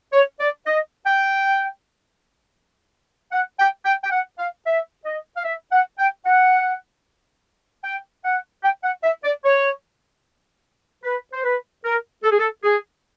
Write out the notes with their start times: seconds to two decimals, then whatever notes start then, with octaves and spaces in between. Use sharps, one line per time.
0.13 C#5
0.40 D5
0.66 D#5
1.06 G5
3.32 F#5
3.59 G5
3.85 G5
4.03 G5
4.12 F#5
4.38 F5
4.66 E5
5.05 D#5
5.37 F5
5.45 E5
5.72 F#5
5.98 G5
6.25 F#5
7.84 G5
8.25 F#5
8.64 G5
8.84 F#5
9.03 E5
9.24 D5
9.45 C#5
11.03 B4
11.32 C5
11.44 B4
11.84 A#4
12.23 A4
12.31 G#4
12.39 A4
12.63 G#4